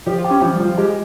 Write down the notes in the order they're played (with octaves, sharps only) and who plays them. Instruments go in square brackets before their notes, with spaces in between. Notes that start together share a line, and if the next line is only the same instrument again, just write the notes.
[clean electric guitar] F3 [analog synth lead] G4
[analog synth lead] F4
[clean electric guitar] G4
[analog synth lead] C#4
[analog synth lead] E3 [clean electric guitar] F3
[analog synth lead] G3
[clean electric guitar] F3
[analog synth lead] F4
[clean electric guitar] G#3 [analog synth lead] G4